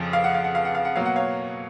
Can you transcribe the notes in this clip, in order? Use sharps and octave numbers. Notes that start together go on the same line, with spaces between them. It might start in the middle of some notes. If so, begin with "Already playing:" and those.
Already playing: F2 C#3 F3
F5
F#5
F5
F#5
F5
F#5
F5
F#5
B2 F#3 A#3 F5
F#5
C#5 F5